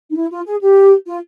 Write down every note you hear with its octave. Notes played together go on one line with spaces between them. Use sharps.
D#4
E4
F4
G#4
G4
F4